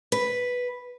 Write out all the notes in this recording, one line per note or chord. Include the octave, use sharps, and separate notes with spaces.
B4